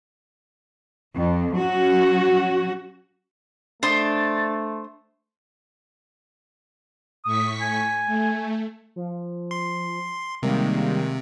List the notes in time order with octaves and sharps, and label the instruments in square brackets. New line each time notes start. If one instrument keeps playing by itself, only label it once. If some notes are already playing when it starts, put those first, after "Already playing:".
[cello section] F2
F#3 C#4 F#4
[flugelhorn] A3 [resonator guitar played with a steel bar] D4 [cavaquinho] C5 C6 D#6 [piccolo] A6
[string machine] A2 C#6 B6 [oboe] D#6
[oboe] G#5
[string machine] A3
[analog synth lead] F3
[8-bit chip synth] C6
[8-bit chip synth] C3 [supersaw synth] D#3 G#3 A#3 [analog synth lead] G3